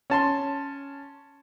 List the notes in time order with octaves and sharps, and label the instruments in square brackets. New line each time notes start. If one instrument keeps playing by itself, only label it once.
[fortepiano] C#4 A5 C6